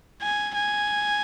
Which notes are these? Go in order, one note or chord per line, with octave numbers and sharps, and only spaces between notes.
G#5
G#5